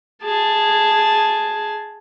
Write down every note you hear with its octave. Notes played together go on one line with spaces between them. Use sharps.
G#4 A5